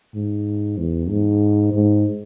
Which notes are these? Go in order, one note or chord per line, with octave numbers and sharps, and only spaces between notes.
G#2
E2
G#2
G#2